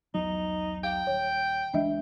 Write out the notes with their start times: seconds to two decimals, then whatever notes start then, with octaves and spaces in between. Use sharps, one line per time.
0.14 B1 E2 F#3 D#4
0.84 F5 G5
1.07 D#1 C#5
1.74 C#2 E3 G#3 D4 D#5 E5